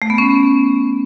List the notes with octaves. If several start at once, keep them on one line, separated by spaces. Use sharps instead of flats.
A3
B3
C#4